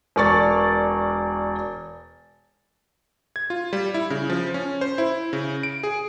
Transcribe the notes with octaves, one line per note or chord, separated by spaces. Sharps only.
E1 A#4 D5 C#6 A6
G#6
F4
G3
E4
C#3
F3
C#4
C5
E4
C#3
D7
G#4